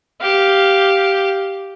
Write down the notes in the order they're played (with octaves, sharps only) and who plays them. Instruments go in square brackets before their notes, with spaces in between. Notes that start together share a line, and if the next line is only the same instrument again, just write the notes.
[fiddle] G4 [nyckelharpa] F5